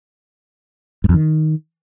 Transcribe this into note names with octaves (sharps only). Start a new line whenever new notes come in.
G2
F2
D#3